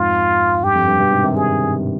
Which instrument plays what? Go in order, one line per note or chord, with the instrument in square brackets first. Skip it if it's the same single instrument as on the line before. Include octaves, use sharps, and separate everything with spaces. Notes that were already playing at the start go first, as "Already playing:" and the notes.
Already playing: [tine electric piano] F2 G#2 [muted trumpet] F4
[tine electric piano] G2 [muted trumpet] G4
[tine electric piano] F2
G2
G2 B2
G#2 C3
C3 D#3
[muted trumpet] G#4